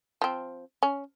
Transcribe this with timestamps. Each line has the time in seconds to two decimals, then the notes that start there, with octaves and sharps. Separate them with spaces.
0.22 F3 C4
0.83 C#4